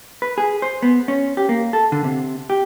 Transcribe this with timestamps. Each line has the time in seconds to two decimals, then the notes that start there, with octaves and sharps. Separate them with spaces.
0.22 B4
0.38 G#4
0.62 C5
0.82 B3
1.08 C#4
1.37 G4
1.49 A#3
1.73 A4
1.92 D3
2.04 C3
2.50 G4